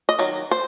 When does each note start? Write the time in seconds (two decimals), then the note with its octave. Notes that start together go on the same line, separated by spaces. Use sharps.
0.09 D#5
0.19 D#3 F#3
0.51 C5